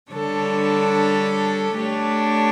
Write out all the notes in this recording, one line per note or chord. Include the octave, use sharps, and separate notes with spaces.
D3 G3 D4 A4 C#5
A3 D4 G4 C#5